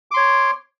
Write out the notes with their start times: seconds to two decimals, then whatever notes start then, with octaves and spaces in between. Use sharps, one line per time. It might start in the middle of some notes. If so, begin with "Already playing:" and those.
0.11 D6
0.14 C6
0.17 C#5